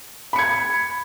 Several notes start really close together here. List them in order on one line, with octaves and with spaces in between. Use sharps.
B5 C#7 G#6